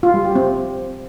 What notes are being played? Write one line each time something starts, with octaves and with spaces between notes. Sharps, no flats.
F4
G3
G4
C4